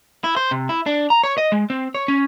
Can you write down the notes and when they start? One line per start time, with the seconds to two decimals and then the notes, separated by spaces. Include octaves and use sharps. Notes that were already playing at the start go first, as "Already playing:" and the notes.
0.24 E4
0.36 C5
0.51 C3
0.69 E4
0.86 D4
1.10 A#5
1.23 C#5
1.38 D#5
1.52 G#3
1.70 C4
1.95 C#5
2.08 C#4